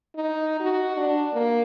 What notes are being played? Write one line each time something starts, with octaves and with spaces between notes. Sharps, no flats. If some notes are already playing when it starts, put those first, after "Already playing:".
D#4
F#4
D4
A#3